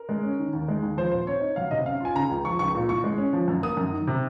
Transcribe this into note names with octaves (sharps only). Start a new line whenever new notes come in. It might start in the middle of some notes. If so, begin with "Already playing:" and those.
Already playing: A#4
G#3
C#4
D#3
D#2
G#3
D#2
F3 C5
A#2 C5
C4 C#5
D#4
F#3 F5
C3 D#5
C#4 F5
F4 G#5
C#3 A#5
C#2
F3 C#6
C#2 C#6
A#2
C2 C#6
G#3
C#4
F3
F#2
A#3 D#6
F#2
D#3
C3